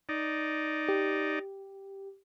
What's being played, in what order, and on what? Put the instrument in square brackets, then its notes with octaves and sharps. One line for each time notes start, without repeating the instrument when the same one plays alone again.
[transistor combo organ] D#4 D5
[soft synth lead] G4